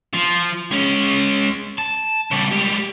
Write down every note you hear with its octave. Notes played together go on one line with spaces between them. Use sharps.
F3
G#3 C#4
A5
C#3 G3
G#3 G4